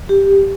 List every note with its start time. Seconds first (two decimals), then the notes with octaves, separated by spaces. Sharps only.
0.09 G4